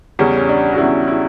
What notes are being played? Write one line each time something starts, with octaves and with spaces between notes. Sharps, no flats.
E2 C#3 G3 C#4
C#4
D4
F#4
E2 C#3 G3 E4
E4